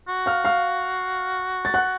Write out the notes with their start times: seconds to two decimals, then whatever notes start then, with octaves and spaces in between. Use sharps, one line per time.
0.08 F#4
0.26 F5 F6
0.45 F5 F6
1.65 A6
1.74 F#5 F#6